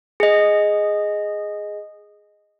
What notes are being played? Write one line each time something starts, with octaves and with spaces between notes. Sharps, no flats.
G#4 D#5